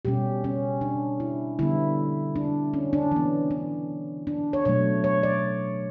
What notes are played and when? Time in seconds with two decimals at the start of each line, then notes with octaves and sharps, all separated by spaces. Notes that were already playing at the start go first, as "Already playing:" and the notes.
0.05 B2 G3 C#4 G4
0.44 C#4
0.81 D4
1.20 E4
1.59 D3 G3 B3 E4
2.36 D4
2.74 C#4
2.93 D4
3.11 E3 B3 C#4
3.51 D4
4.27 D4
4.53 C#5
4.65 B2 F#3 A3 C#5
5.04 C#5
5.23 D5